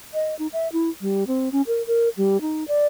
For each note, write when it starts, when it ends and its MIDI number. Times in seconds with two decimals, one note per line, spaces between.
0.14 0.37 75
0.39 0.47 63
0.53 0.71 76
0.73 0.90 64
1.01 1.24 55
1.27 1.49 60
1.52 1.62 61
1.67 1.85 70
1.87 2.09 70
2.17 2.41 55
2.41 2.66 63
2.68 2.87 74